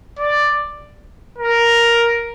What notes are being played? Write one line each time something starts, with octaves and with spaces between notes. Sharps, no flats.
D5
A#4